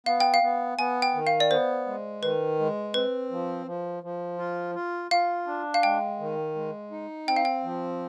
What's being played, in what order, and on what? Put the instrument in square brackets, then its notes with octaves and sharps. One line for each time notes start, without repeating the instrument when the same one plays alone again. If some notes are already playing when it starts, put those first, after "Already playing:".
[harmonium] B3 [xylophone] F5
[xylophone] G5
F5
[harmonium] B3
[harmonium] B3 [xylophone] G#5
[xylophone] G5
[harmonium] D#3
[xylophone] F5
D5
[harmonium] B3 [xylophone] C5
[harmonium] G#3
[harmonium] D#3 [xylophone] B4
[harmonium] G#3
[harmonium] C4 [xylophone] B4
[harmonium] F3
F3
F3
F4
F4
[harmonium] F4 [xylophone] F5
[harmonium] D4
[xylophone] F5
[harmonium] G#3 [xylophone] G5
[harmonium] D#3
G#3
D#4
[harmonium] C4 [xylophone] G5
[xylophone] F5
G5
[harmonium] F3